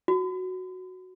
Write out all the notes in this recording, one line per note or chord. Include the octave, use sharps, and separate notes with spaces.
F#4